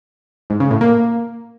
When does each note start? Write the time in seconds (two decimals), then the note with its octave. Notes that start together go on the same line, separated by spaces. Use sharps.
0.50 G#2
0.60 C#3
0.71 A2
0.81 A#3